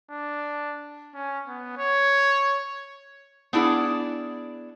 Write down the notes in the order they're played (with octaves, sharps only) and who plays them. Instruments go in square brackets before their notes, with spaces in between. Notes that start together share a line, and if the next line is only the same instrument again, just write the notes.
[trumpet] D4
C#4
B3
C#5
[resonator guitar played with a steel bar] B3 D4 E4 G#4 F#5